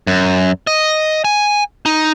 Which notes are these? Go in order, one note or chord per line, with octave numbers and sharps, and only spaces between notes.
F#2
D#5
G#5
D#4